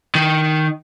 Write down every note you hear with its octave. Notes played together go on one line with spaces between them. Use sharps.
D#3